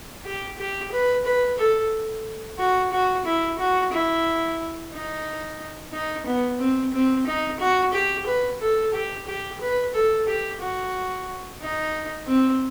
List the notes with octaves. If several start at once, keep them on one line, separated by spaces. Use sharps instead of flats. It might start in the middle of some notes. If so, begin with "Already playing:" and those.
G4
G4
B4
B4
A4
F#4
F#4
E4
F#4
E4
D#4
D#4
B3
C4
C4
D#4
F#4
G4
B4
A4
G4
G4
B4
A4
G4
F#4
D#4
C4